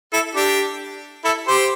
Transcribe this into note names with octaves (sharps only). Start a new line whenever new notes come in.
E4 A4
D4 G4
E4 A4
G4 C5